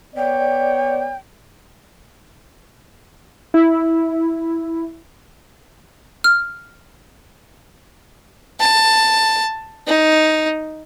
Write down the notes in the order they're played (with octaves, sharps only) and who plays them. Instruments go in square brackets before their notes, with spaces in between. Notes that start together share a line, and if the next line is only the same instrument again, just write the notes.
[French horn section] B3 C#5 D5 [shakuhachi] G5
[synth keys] E4
[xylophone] F6
[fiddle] A5
D#4